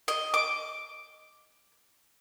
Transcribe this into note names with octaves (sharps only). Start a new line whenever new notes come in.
D#5
D6